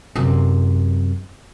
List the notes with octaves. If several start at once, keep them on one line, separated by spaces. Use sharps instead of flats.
F#2 C3